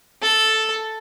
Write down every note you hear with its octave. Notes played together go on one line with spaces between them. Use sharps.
A4